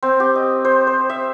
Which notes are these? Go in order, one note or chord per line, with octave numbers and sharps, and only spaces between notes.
C4
G4
D#5
C5
C5
E5